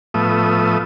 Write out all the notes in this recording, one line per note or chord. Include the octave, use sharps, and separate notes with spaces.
A2 F3 A3 B3 E5 D#6